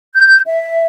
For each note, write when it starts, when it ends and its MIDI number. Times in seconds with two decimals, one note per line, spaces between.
0.15 0.40 91
0.46 0.87 76